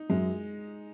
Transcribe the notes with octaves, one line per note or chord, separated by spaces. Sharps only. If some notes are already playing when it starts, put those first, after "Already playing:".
Already playing: D#4
F#2 G#3